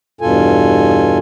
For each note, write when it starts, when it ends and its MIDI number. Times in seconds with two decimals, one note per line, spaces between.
0.21 1.18 40
0.21 1.18 43
0.21 1.18 47
0.21 1.18 65
0.21 1.18 69
0.21 1.18 80